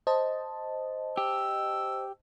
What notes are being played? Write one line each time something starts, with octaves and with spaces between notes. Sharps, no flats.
C5 D#5 A5
G4 E6